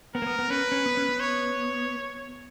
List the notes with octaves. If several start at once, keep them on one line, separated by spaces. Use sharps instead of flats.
B3 A#4
A#3
B3
B3
C#4 B4
C#4
B3
C#4
B3
C#5